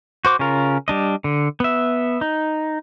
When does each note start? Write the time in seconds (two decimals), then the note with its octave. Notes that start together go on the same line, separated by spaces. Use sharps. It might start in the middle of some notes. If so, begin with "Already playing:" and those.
0.25 F#4 C5 D6
0.39 C#3 C#4 F4 A#4
0.88 G3 D4 D#5
1.24 D3
1.60 B3 E5
2.21 D#4